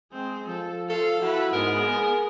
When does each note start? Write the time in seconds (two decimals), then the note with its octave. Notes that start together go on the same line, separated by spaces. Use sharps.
0.12 G#3 C4
0.48 F3 A4
0.90 F4 A4 F5
1.22 E4 F#4 B4
1.53 G#2 G#3 B3 A#4
1.82 G#4